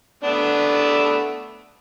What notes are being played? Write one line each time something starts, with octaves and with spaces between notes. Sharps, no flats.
A3 B3 D4